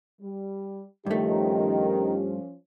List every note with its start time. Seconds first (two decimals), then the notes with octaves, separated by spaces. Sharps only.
0.21 G3
1.06 G2 D#3 F3 A3 C#4 G4